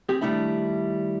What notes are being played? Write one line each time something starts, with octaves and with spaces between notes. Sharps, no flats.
C4 G4 G#4
D#3 F3 G3 A3 D4 E4